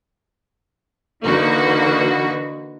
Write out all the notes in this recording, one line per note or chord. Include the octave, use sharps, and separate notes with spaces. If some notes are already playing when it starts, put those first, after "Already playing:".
D3 E3 A#3 D#4 F#4 B4